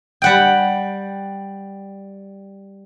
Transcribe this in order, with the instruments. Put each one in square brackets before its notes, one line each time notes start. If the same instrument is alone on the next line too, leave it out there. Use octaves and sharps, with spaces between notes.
[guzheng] G3 F#5 G5